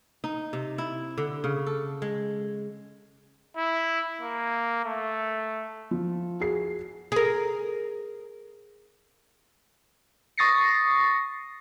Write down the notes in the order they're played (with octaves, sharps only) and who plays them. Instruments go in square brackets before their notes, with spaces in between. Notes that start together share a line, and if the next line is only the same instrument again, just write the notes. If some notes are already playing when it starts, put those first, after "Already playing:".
[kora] D#4
C3
E4
D3
C#3
A4
G#3
[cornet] E4
A#3
A3
[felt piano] F3
F#4 G#4 C7
[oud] G#4 A#4
[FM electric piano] C#6 D#6 A6 A#6 C7 C#7